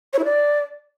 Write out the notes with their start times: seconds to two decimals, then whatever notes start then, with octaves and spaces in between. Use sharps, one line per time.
0.13 C#5
0.19 E4
0.25 D5